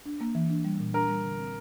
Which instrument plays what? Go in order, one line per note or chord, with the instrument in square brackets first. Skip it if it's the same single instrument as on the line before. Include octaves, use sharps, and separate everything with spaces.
[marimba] D4
A#3
E3
D4
G3
A#2
[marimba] D4 [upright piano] A#4
[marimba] G3
D3
C4